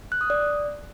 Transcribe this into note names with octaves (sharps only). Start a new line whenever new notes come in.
F#6
D#6
D5